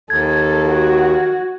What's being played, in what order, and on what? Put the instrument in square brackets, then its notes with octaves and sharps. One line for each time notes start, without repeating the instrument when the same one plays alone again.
[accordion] D#2 [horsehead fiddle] A4 [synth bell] G#6
[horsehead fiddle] F#4